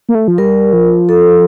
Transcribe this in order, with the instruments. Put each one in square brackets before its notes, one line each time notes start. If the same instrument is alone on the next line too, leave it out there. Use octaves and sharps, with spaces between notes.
[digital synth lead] A#3
A3
F3
[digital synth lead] G3 [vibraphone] A#4
[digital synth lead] F3
[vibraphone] A4